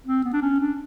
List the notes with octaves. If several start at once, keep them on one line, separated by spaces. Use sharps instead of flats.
C4
B3
D4
C#4
D4